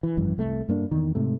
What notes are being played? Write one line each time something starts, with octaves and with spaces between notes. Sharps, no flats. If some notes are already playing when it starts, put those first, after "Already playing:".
E3
G#1 F#2 E3
C2 A3
G2 A#3 D4
E2 D#3
G#2 C3 A3